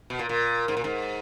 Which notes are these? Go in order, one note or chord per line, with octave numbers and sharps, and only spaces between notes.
B2
A#2
A#2
G#2
A#2
G#2